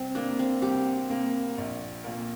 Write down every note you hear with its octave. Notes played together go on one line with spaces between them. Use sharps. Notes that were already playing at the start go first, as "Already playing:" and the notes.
Already playing: C2 C4
C3 A#3 D4
C4
C2 G4
C3 A#3
A#1
A#2 A#3 F4 A#4